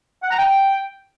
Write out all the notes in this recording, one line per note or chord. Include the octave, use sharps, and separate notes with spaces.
F#5
A#5
G5